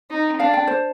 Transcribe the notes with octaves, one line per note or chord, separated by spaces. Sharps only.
D#4
D4 F5
G5
C5